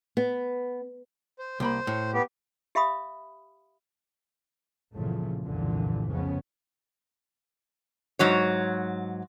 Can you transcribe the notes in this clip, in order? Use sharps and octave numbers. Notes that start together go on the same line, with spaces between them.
B3
C5
C2 A#3 C5 B5
A2
B3 G4
G4 E5 F5 B5 D#6
G1 E2 A#2 C#3 F3 A3
F1 C2 G2 A#2 D3 E3
F1 F2 C#3 B3 C#4
G#2 F#3 C#5